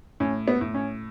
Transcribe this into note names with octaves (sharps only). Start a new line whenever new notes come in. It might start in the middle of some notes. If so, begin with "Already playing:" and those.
A2 C#4
B3
A2
C#4